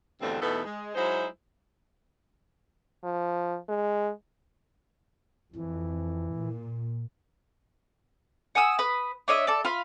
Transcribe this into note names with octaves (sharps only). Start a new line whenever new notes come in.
E2 G2 B2 D3 A3 C4
E2 B2 A3 B3 D#4 A4
G#3
F#3 G#3 D#4 E4 C5
F3
G#3
F2 E3
A#2
F#5 G#5 D#6 E6
B4 D#6
D4 C#5 D#5 E5
A4 D5
F4 F5 B5